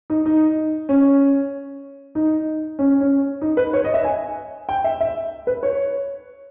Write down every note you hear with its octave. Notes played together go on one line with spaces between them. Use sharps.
D#4
D#4
C#4
D#4
C#4
C#4
D#4
B4
C#5
D#5
E5
G#5
G5
E5
E5
B4
C#5